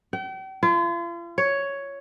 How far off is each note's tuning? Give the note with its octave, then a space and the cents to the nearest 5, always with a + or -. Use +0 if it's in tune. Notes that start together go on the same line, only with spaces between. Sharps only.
G5 -40
F4 -40
C#5 +5